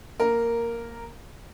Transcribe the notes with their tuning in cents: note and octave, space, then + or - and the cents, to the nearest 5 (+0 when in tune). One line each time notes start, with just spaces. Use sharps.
A#3 +0 A#4 -5